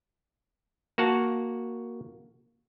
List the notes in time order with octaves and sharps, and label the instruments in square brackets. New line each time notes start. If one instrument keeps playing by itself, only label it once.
[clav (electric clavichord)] A#3 F#4 F#5 A5